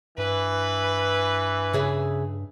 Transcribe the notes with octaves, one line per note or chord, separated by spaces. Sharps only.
G2 E3 B4
C#3 G#4 E5